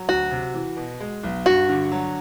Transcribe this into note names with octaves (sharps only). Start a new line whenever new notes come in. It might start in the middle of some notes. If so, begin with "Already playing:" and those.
Already playing: F#3
D2 F#4
C3
E3
B2
G#3
B1
G2 F#4
D3
F#3